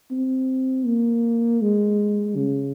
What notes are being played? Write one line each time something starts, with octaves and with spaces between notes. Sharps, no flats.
C4
A#3
G#3
C#3